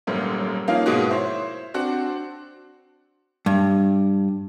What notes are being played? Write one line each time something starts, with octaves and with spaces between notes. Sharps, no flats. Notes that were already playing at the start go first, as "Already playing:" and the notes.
D#1 G#1 F#2 A3 A#3
F3 A#3 C#4 D#4 F5
G#2 B2 G#3 A#3 B3 F#4
E4 C5 C#5
C4 D4 F#4
G2